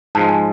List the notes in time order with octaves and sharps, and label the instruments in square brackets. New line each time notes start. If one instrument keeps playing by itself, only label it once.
[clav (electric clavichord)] G#2 F3 G#3 [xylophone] A5
[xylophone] G#5